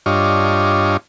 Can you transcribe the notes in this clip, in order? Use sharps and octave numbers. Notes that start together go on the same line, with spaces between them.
G2 D4 F4 C#5 D#5